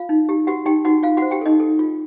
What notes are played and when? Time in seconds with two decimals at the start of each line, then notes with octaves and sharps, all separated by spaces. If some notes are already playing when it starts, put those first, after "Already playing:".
Already playing: F4 F5
0.09 D#4
0.29 G4
0.47 F#4 G4 F#5
0.65 D#4 G4 G5
0.85 D#4 F#4 F#5
1.03 F4 F5
1.17 F#4 C5 F#5
1.31 G4 G5
1.41 D#4 A4 D#5
1.60 A4
1.79 F4